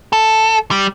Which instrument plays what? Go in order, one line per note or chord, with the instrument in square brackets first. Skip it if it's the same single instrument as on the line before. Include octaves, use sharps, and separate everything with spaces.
[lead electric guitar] A4
G3